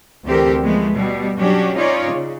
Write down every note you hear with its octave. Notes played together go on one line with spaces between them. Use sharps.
D2 E3 C4 G4 A4 A#4
F3 G#3 A3 B3
B2 G3
F#3 C#4 D4 F#4 G4
C#4 D#4 F4 C#5 D5
C#3